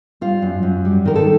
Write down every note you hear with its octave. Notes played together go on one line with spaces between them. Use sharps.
G3 F4
F#2
F#2
G3
D#3 A#4
A4